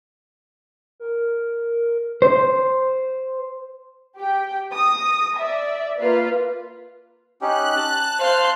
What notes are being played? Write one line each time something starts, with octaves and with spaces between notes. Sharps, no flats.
A#4
C5
G4 G5
D#6 A#6
D5 E5
A#3 F4 B4 F5
C#4 D#4 G4 F#6
A5
C5 F5 C6